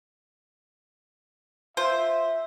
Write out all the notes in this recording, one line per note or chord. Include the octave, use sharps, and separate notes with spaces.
F4 C5 E5